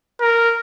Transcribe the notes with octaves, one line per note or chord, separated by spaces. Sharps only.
A#4